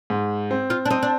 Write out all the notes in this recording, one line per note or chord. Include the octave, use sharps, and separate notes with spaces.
G#2
C4
F4
D4
C4 D#4
D4